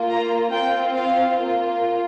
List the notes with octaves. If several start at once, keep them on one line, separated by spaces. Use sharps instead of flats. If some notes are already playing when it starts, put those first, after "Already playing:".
Already playing: A#3 F4
A#5
C4 F4 G5
F5
A#3 F4